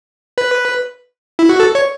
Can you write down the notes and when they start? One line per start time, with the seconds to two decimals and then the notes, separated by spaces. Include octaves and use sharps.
0.38 B4
1.39 E4
1.49 F#4
1.60 A4
1.75 C#5